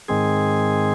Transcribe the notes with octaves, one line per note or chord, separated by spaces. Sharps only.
G#2 D#3 G#3 C4 G#4